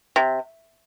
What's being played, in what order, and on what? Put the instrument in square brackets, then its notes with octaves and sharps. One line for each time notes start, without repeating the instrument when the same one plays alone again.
[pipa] C3